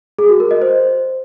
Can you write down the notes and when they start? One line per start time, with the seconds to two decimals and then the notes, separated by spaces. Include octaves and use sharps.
0.18 G#4
0.29 F#4
0.40 A#4
0.51 D#5
0.62 C5